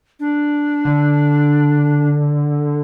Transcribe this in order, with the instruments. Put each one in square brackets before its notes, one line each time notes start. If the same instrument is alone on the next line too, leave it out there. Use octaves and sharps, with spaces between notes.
[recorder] D4
[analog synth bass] D3